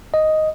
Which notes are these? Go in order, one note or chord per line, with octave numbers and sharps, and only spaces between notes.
D#5